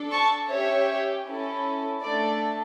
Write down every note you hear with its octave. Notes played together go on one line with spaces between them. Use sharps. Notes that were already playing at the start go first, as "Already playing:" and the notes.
Already playing: D4 A4
A5 C#6
C#4 G4 C#5 E5
C#4 E4 A4
A3 D4 A4 D5